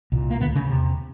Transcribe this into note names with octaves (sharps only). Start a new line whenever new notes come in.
C2 A#2
A#3
D2 B2 D3 B3
C#3 C#4
E2 C3